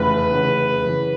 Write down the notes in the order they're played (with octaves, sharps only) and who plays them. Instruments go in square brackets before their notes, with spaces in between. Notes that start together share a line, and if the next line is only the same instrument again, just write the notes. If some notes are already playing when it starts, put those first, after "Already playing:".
Already playing: [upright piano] F1 E2 C#3 [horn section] B4
[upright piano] F1 E2 C#3
F#2 C#3 E3